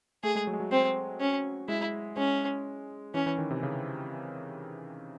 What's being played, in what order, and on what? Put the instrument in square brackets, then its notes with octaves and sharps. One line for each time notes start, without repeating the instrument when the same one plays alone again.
[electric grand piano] A3 [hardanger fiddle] G#4
[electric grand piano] G#3
F#3
G#3
F#3
[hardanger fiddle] C4
C#4
[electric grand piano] G#3 [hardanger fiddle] E4
[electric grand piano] G#3 [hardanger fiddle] C#4
[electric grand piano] E3 [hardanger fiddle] C#4
[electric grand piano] E3
D#3
C3
C#3